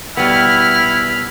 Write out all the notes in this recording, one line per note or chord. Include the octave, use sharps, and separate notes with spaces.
B2 G3 B3 E4 B5 F6